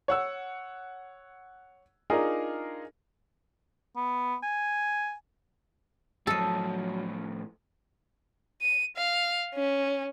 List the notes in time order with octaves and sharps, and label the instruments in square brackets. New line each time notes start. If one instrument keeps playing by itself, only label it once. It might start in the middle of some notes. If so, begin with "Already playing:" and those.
[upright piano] C#5 F#5 E6
D4 D#4 F4 G#4 A#4
[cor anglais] B3
G#5
[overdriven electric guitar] A2 F3 [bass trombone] F#3 [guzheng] A4 D#5
[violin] D#7
F5
C#4